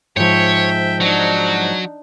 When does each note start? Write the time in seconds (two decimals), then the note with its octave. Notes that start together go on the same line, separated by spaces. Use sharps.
0.17 G#2 F3 C#5 E5 G5
1.01 F#3 D4 D#4